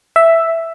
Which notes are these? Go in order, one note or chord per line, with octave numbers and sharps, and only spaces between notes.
E5